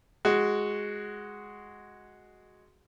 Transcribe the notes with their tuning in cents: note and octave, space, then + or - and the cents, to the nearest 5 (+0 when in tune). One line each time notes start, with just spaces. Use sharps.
G#3 +0 F#4 +0